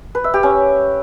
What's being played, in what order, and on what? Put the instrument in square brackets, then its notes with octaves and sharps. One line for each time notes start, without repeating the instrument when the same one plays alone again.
[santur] B4
E5
G4
C#4